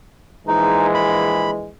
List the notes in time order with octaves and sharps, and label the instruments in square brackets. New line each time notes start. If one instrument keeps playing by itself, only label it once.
[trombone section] A#1 E3 G#3 [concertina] D#4
[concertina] B5